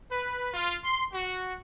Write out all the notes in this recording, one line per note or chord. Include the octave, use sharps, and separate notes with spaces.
B4
F4
C6
F#4